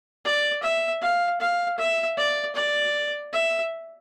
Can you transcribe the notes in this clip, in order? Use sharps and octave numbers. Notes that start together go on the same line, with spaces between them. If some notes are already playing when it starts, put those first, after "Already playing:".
D5
E5
F5
F5
E5
D5
D5
E5